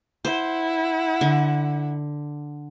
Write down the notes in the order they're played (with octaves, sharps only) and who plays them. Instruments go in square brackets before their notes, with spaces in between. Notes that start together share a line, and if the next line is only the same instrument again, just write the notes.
[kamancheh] E4 F#5 [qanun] C5
[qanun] D3